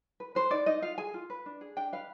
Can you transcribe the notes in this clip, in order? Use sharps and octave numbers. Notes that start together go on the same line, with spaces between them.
B4
B4 C5
D#4 D5
D#4 D#5
F4 F5
G#4 G#5
F4
B4
D4
G#4
D4 G5
B4 F5